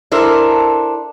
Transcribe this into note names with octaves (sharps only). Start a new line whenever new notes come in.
D4 E4 A4 A#4 C5